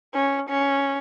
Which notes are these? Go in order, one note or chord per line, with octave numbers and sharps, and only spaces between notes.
C#4
C#4